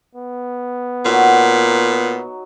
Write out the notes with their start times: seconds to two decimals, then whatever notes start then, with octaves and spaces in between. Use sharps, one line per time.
0.15 B3
1.05 A#2 F#3 D#4